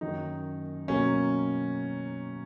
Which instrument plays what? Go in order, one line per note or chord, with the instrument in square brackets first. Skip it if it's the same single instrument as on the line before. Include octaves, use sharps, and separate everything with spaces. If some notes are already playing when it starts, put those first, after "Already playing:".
[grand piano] F#2 D#3 F#3 D#4
B2 F#3 A#3 C#4